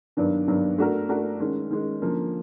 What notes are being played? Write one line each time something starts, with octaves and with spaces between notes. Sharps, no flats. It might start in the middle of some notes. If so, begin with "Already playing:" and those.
G2 D#3 F#3 B3 D4
G2 D#3 F#3 B3 D4
A3 D4 F#4 A#4
A3 D4 F#4 A#4
D#3 G#3 C#4
D#3 G#3 C#4
D3 F3 A#3 C#4